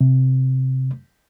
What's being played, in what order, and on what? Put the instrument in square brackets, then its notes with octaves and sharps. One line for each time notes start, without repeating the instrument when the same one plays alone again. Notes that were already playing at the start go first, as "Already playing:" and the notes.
[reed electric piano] C3